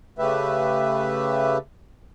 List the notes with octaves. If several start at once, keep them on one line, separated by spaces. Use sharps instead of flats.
C#3 A3 G4 B4 E5